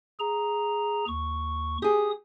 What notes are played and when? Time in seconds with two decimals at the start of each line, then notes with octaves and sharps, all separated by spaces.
0.20 G#4 A#5
1.08 D#2 C#6
1.82 G4 G#4 D#6